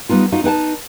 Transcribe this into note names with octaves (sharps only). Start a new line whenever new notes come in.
G3 B3 D#4 F4
D#4 F4 F#4
D#4 B4 G5 A5